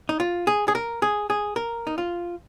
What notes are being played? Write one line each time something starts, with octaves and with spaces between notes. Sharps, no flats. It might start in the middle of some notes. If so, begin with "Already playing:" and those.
D#4
F4
G#4
G#4
A#4
G#4
G#4
A#4
D#4
F4